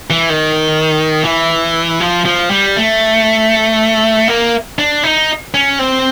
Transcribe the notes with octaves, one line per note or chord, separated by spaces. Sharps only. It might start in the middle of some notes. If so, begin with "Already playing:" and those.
E3
D#3
E3
F3
F3
G3
A3
A#3
D4
D#4
C#4
C4